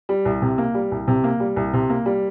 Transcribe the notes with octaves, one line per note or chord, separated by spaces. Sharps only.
G3
C2
C3
A#3
G3
C2
C3
A#3
G3
C2
C3
A#3
G3